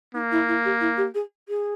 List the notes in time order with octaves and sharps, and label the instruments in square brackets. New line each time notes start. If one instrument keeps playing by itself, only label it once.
[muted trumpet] A#3 [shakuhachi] D#4
[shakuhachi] E4
E4
G4
E4
G4
G#4
G#4